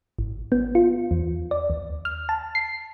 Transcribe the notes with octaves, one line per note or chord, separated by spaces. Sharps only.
G#1
B3
F4
E2
D5
D#2
F6
A5
C7